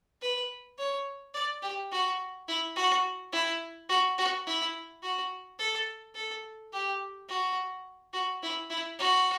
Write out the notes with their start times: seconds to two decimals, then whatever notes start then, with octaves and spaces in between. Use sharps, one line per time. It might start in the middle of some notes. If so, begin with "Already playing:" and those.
0.22 B4
0.78 C#5
1.34 D5
1.62 G4
1.92 F#4
2.48 E4
2.76 F#4
3.32 E4
3.89 F#4
4.18 F#4
4.46 E4
5.03 F#4
5.58 A4
6.15 A4
6.73 G4
7.29 F#4
8.13 F#4
8.42 E4
8.70 E4
8.99 F#4